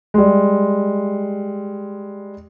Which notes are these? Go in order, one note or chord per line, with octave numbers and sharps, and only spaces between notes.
G3 G#3